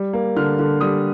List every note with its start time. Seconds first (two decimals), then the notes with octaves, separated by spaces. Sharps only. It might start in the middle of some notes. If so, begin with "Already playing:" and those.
Already playing: G3
0.13 A#3
0.36 D3 F6
0.59 D3
0.81 G3 D#6